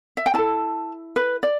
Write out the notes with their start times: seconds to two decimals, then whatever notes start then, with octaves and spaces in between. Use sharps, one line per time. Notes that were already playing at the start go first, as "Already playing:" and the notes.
0.17 E5
0.26 G5
0.34 E4 A4 A5
1.16 B4
1.43 D5